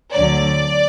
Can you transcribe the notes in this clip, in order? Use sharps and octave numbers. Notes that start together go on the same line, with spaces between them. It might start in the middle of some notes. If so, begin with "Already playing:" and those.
D2 D3 F#3 D5